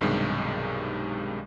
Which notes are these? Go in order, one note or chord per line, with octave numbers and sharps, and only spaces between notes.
B1 G2 C3 D#3 G#3